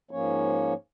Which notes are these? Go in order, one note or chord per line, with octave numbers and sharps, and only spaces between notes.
G#2 F3 A#3 C#4 C#5